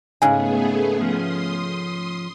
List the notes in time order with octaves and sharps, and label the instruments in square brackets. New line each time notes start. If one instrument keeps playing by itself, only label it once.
[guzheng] G#2 C#3 [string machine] A3 B3 G#4 [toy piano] G#5
[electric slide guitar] F3 C#4 [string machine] C6 D#6